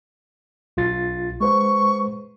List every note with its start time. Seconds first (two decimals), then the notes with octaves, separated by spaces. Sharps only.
0.77 B1 F4 A6
1.41 G#3 B4 C5 C#6